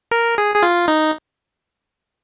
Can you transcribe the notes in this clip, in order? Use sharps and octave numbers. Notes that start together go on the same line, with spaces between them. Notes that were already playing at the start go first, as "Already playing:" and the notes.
A#4
G#4
G#4
F4
D#4